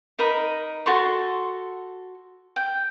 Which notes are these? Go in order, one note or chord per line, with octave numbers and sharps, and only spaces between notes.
D#4 A#4 D#5 B5
F#4 A4 C6 C#6
G5